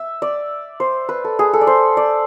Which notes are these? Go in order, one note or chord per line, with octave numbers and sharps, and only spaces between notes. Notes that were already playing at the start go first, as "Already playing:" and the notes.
Already playing: E5
D5
C5
B4
A4
G#4
A4
D5
C5
D5